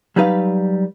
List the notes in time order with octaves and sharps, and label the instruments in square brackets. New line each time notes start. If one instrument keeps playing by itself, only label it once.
[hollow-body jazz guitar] F#3 G3 D#4 B4 F5